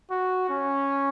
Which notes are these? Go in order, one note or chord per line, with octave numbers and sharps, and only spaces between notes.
F#4
C#4